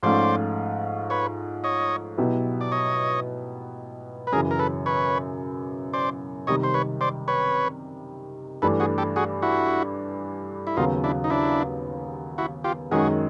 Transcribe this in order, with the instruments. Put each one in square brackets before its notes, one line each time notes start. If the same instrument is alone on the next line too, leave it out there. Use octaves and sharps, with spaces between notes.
[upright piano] G#2 F3 A3 C#4 F4 [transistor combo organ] C5 D5
[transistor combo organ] B4 C#5
C#5 D#5
[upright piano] B2 F#3 B3 E4 G4
[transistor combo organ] D5
C#5 D#5
B4
[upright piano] F#2 C#3 E3 [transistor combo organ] G#4 A#4
[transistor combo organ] A#4
A4 B4
B4 C#5
C5 D5
[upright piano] C3 D#3 G3 [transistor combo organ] C#5 D#5
[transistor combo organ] C5
B4 C#5
C5 D5
B4 C#5
[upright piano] G2 E3 A3 D4 [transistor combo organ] A4 B4
[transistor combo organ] F#4 G#4
G4 A4
F#4 G#4
E4 F#4
E4
[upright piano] D#2 C#3 F#3 B3 [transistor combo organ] D#4 F4
[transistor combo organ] D4 E4
D#4
D4 E4
E4 F#4
F4 G4
[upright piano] F#2 D#3 G#3 C#4 [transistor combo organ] F#4 G#4